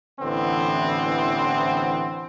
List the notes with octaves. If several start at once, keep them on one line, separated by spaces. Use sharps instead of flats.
A1 D3 E3 B3 C4